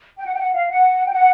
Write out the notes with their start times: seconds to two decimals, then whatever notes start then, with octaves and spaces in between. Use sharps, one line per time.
0.18 G5
0.25 F#5
0.34 G5
0.40 F#5
0.54 F5
0.69 F#5
1.06 G5
1.12 F#5